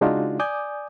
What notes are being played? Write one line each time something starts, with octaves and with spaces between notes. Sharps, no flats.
C#3 G#3 D4 D#4 F4 F#4
D5 G#5 D6 D#6 G6